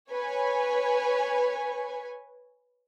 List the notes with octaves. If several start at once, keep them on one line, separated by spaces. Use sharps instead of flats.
B4 C#5 G#5